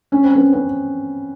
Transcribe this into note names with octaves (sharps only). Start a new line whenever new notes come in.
C#4
C4
B3 C#4
B3 C#4